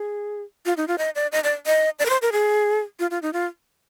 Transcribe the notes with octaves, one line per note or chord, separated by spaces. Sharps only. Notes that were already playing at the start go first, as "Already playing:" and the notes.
Already playing: G#4
F4
D#4
F4
D#5
D5
D#5
D5
D#5
D5
A#4
C5
A#4
G#4
F4
F4
D#4
F4